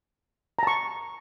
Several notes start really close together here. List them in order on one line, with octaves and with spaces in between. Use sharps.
A#5 A5 C#6